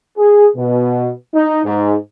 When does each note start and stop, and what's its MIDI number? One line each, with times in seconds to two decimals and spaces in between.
0.18 0.47 68
0.56 1.09 47
1.34 1.59 63
1.65 1.94 44